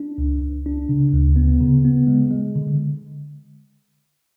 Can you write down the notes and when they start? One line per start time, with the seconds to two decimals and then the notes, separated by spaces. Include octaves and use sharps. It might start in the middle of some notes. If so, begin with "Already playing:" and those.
Already playing: D4
0.18 C#2
0.41 C#2
0.66 D4
0.89 C#3
1.13 D2
1.36 B3
1.60 C#3
1.85 B3
2.07 G#3
2.31 G#3
2.56 D3